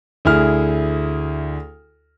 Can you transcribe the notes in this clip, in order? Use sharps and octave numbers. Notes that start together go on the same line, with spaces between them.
D2 E4 G#4 F6